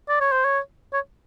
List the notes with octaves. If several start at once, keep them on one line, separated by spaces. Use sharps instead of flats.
D5
C#5
C5
C#5
C#5